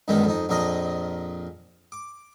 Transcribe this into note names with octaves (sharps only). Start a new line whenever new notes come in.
C#2 G2 D#3 G#3 B3
F2 D#4
A#1 F2 A#2 A#4 D#5
D6